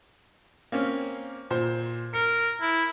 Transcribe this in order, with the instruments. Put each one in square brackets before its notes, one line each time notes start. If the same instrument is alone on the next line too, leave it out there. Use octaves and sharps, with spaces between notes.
[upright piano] A#3 C4 C#4
A#2 C5
[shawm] A#4 [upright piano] C#7
[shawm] E4